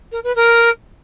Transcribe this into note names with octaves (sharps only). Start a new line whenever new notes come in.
A#4
B4
A#4